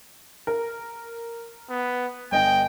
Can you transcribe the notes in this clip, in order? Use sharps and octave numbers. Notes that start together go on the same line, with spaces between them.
A#4
B3
G1 D#5 G5 G#5